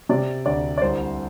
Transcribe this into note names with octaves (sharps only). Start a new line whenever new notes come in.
C3 D5
D2 D5
D5
C2 C5